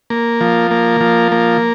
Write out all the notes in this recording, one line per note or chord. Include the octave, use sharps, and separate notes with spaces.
A#3
F3
A#3
F3
A#3